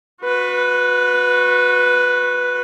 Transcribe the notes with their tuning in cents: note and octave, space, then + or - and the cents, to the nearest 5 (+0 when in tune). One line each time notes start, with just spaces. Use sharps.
F#4 -30 B4 +0